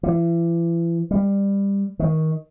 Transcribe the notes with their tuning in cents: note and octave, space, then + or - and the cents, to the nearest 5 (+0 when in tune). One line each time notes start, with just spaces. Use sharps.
E3 +35
G3 +20
D#3 +20